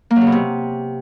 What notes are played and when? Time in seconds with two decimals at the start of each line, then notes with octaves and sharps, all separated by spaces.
0.11 A#3
0.16 F#3
0.21 C#3
0.27 B2
0.32 C3